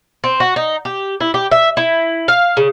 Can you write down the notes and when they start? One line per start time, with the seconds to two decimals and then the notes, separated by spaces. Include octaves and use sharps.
0.24 C4
0.40 F#4
0.56 D#4
0.85 G4
1.20 E4
1.34 G4
1.51 E5
1.77 E4
2.28 F5
2.57 C#3